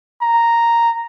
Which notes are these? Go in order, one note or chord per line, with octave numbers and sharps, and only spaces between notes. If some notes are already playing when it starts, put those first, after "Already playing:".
A#5